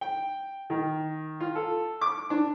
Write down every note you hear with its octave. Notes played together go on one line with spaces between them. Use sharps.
G5
D#3
F4
A4
D6
D4